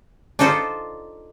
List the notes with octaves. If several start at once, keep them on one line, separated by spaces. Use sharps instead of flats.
D4 D#4 F4 A4 C5